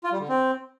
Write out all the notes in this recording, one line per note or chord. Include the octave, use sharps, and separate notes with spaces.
F4
G3
D3
C4